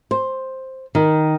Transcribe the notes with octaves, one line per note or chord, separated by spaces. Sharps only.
C5
D#3